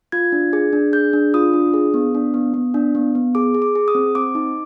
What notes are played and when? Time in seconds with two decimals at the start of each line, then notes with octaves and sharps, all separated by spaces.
0.12 F4 G#6
0.32 D4
0.53 G#4
0.73 D4
0.93 G#4 G6
1.13 D4
1.34 F4 D#6
1.53 D4
1.74 G#4
1.94 B3
2.15 D4
2.34 B3
2.54 B3
2.74 D4
2.95 B3
3.15 B3
3.35 G#4 D6
3.54 G#4
3.62 D6
3.75 G#4
3.88 D#6
3.95 C4
4.15 C4 D6
4.35 D#4